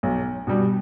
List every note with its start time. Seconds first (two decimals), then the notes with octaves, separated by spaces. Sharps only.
0.03 B1
0.47 B2 G3